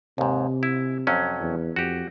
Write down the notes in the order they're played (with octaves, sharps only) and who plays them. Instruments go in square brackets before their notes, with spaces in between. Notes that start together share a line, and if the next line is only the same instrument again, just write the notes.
[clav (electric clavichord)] D#2 G#2 [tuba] C3
[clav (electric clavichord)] E4
F2 F#3 C#4
[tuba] E2
[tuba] F2 [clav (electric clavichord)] F#4 G4